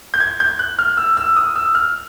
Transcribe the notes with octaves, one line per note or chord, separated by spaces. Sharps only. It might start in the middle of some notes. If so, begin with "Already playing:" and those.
G6
G#6
G6
F#6
F6
E6
E6
D#6
E6
F6